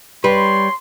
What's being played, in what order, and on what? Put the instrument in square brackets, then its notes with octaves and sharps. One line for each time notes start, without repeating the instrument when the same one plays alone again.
[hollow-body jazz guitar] G3 B4 [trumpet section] C#5 C6